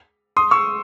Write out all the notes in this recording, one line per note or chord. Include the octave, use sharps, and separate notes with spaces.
C6 D#6
C#6 E6